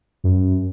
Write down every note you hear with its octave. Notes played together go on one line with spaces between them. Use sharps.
F#2